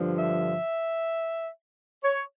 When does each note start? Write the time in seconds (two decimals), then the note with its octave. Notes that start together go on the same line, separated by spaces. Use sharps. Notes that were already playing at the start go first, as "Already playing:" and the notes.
Already playing: G2 D3 F3
0.19 E5
2.04 C#5